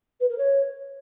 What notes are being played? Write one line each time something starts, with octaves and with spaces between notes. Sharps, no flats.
B4
A#4
C#5